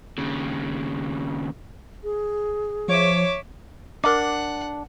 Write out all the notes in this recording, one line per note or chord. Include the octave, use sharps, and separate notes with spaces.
D#2 C#3
G#4
F3 C#5 E5 D6
D4 A#4 F#5 D6